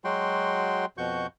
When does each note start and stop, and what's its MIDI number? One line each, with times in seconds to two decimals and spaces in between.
0.04 0.85 54
0.04 0.85 56
0.04 0.85 66
0.04 0.85 79
0.04 0.85 84
0.98 1.27 41
0.98 1.27 47
0.98 1.27 66
0.98 1.27 85
0.98 1.27 91